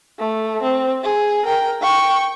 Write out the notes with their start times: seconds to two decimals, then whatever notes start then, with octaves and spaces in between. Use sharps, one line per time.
0.19 A3
0.63 C4
1.03 G#4
1.46 A#4 G5
1.82 G5 C#6